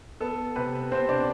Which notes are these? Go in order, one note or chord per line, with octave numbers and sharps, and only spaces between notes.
B3 A4
C3 B4
C3 C4 C5
D4 D5